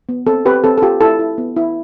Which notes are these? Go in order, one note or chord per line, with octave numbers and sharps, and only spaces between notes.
B3
C4 A4
C4 G4 B4
C4 A4
A4
F4 G4
E4 A4
E4
B3
E4